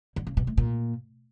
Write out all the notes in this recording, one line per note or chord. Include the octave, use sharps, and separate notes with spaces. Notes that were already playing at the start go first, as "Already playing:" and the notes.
D3
C#3
B2
A2
A#2